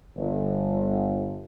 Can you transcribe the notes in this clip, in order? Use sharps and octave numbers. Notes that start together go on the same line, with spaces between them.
G1